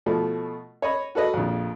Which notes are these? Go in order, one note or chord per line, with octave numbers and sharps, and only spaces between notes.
B2 F3 A3
C#5 D#5 B5
F#4 A4 B4 D#5
A#1 F2